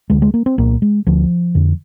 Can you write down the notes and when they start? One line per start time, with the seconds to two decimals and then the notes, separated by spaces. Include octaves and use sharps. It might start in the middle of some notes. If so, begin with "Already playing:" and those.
0.10 D2 D3 G#3
0.22 G#3
0.34 A#3
0.46 C4
0.58 C2 A#2 A#3
0.82 G#3
1.07 D2 D3 F3
1.55 F2 D3